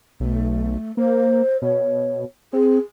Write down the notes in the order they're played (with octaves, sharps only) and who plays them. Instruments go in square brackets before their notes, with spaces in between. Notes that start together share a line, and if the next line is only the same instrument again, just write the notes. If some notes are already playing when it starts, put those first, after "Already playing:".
[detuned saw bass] B1 [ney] A3
[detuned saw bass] A#3 [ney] C5
[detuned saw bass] B2 [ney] C#5
[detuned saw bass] C4 [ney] G#4